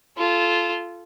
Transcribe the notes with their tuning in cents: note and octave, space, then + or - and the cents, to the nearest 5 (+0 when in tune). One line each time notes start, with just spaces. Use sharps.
F4 -15 A4 -20